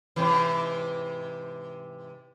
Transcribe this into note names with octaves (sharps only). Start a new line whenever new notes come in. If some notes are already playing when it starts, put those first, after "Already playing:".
G#2 C3 E3